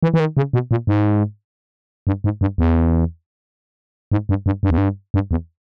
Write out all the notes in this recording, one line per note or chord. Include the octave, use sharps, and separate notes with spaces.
E3
E3
D#3
C#3
B2
A#2
G#2
G2
G#2
G2
E2
G#2
G2
G2
G2
E2
G2
G2
E2